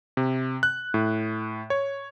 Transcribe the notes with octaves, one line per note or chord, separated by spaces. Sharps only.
C3
F#6
A2
C#5